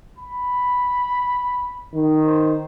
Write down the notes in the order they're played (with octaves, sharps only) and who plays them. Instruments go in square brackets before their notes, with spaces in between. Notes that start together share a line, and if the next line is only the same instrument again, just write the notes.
[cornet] B5
[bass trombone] D#3
[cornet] C5